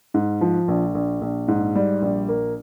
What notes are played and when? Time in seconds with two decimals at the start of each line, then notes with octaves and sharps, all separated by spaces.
0.14 G#2
0.41 F3
0.68 A#1
0.94 A#1
1.21 A#1
1.48 G#2
1.76 G3
2.02 A#1
2.29 A#3